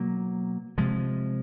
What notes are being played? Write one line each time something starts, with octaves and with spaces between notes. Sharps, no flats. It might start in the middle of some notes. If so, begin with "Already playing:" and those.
Already playing: B2 F#3 A#3
C3 F3 G#3